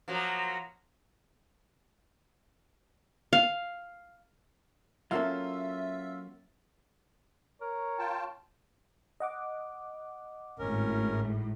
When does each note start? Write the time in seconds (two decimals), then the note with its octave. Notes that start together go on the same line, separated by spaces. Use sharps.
0.08 F3 F#3 A#3
3.33 F5
5.11 F#3 A#3 C#4 F4 A4 E5 E6
7.61 A#4 C#5
7.99 F4 G5 A5
9.20 D#5 F#5 D6
10.59 G#1 A2 C#4 A#4